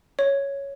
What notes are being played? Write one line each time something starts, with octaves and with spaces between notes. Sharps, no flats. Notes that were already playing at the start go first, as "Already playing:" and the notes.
C#5